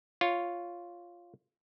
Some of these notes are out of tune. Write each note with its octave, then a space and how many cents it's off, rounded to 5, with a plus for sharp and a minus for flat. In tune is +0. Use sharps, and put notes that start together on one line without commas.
F4 +0 C#5 +0